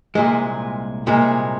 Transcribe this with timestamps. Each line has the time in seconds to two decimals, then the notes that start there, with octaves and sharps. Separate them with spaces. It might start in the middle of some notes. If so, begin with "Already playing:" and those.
0.15 C2 A#2 G#3
1.07 C2 A#2 G#3